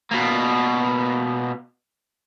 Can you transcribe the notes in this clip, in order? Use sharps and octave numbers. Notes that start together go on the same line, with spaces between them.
B2 A#3